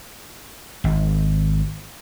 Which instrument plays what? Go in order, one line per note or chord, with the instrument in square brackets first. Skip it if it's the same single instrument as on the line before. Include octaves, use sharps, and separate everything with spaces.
[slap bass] G#1